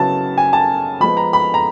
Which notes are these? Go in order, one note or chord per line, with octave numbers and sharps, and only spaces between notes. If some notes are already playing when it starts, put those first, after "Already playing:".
Already playing: C#3 F#3 B3 E4 A5
G#5
A5
F3 G#3 B3 B5
A#5
B5
A#5